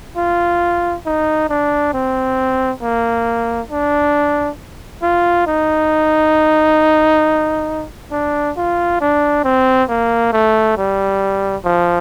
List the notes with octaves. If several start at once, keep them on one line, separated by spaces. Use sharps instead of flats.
F4
D#4
D4
C4
A#3
D4
F4
D#4
D4
F4
D4
C4
A#3
A3
G3
F3